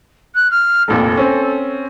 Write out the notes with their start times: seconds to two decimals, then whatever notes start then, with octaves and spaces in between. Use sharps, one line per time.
0.35 F#6
0.51 F6
0.88 F1 A#1 F2 A4
1.17 C4 C#4